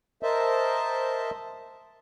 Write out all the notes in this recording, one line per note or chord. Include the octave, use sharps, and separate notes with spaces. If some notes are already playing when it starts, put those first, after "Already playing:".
A#4 C5 D#5 E5 A5